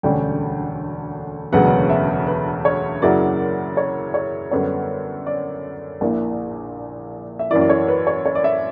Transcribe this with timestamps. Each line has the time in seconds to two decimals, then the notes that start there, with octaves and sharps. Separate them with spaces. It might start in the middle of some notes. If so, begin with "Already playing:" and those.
0.03 E1 D2 D3 G3 C#4 G5
1.52 E1 D2 C#3 F#3 B3 F#5
1.90 E5
2.27 B4
2.65 C#5
3.02 F#2 C#3 F#3 A#3 E4 D5
3.77 C#5
4.14 C#5
4.51 F#2 D3 G3 B3 D4 C#5
5.26 D5
6.01 A#1 A#2 A#3 E4
7.39 E5
7.51 F#2 E3 A#3 E4 D5
7.61 D5
7.69 C#5
7.88 B4
8.07 C#5
8.26 C#5
8.35 D5
8.44 E5